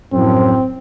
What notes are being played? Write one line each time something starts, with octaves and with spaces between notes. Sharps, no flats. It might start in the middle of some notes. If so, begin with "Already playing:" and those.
F#2 A2 F3 C4